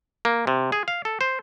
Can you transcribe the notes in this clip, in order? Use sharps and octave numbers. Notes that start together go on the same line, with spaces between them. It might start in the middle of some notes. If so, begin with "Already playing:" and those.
A#3
C3
G#4
F5
A4
C5